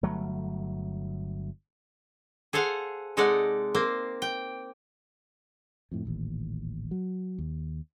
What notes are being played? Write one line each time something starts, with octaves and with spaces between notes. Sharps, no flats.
G1 F#3 A3
G#4 A4 C5 F5 F#5
C3 G#3 D#4 A4 D5 F#5
A#3 C4 C5
G5
F2 A2
D#1 A1 D#2
F#3
D#2